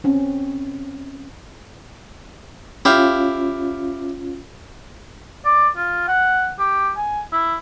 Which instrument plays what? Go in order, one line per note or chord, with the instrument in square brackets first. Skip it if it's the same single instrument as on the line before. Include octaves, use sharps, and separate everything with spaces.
[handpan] C4 C#4
[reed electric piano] C#4 F4 [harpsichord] E4 G4 F5
[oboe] D5
F4
F#5
G4
G#5
E4